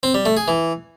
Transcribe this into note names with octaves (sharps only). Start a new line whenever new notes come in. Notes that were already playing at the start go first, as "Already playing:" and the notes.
C4
G3
A3
G#4
E3